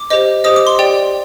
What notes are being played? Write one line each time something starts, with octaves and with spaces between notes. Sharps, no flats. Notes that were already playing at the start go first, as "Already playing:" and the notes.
Already playing: D6
G4 C5 D#5
G4 C5 D#5 D#6
D6
C6
G4 D5 G5